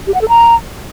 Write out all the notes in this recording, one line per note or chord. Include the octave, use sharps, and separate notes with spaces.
G4
F#5
A4
A#5